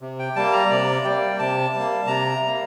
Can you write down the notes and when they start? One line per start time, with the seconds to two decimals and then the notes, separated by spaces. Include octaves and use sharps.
0.01 C3
0.19 G5
0.36 G3 A#3 A5
0.53 A#5
0.70 C3 D5
1.04 G3 A#3 G5
1.39 C3 A5
1.74 G3 A#3
2.07 C3 A#5
2.42 G3
2.47 A#3